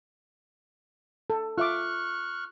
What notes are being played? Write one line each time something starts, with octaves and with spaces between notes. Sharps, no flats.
A4
F4 E5 C#6 D6 F6 F#6